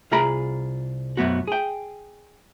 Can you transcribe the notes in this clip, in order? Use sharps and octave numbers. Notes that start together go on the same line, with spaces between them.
C2 F4 G#4 A#5 B5
B1 F#2 F#3 B3 F#4
G#4 G5